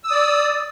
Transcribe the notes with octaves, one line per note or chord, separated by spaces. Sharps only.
D5 D#6 E6